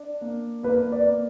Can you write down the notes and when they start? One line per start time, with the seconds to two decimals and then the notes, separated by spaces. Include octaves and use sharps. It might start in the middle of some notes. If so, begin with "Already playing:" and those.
Already playing: D4
0.21 A#3
0.63 A#3 B4
0.92 D5
1.06 A#3